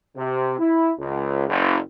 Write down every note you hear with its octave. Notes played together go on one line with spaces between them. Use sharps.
C3
E4
C#2
F#1